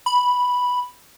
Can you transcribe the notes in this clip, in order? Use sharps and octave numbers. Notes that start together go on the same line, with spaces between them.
B5